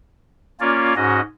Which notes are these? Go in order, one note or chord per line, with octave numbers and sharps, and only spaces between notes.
A#3 C#4 F4 C#5 D5
G#2 C#4 F#4 D#5